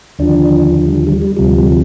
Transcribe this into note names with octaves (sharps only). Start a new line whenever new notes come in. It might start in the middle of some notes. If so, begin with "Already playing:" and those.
D#2 D3 F3 D4
F3
G3
F3
G3
G3
D2 C3 F3 G3
G3
F3